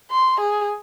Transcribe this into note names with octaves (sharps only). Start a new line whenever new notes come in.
C6
G#4